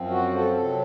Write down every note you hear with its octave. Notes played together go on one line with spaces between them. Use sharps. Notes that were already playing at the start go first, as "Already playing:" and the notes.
Already playing: F#2 F3 C4
F#4
A4
C3 F#3 C4